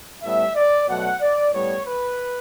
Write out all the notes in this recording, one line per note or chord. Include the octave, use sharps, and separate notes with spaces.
A2 G3 B3 E5
D5
B2 F#3 A3 F#5
D5
A2 G3 B3 C#5
B4